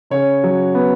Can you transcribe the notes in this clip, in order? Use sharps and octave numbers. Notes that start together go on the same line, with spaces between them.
C#3 C#5
F#3
B3